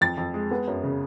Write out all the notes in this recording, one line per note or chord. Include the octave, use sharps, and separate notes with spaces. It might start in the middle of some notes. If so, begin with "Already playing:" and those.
F2 A6
F2
G#3
B3
F#2
C#3